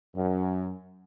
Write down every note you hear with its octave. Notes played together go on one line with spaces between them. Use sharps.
F#2